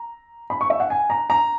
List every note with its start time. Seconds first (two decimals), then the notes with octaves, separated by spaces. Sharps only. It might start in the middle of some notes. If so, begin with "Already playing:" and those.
Already playing: A#5
0.50 B5
0.61 C#6
0.70 E5
0.80 F#5
0.90 G#5
1.10 A#5
1.30 A#5